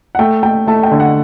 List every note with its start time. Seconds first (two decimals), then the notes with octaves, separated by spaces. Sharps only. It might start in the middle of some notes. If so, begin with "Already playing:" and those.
0.15 F#5
0.19 A3 G5
0.43 A3 G5
0.67 A3 A5
0.83 G5
0.91 D3
1.00 F#5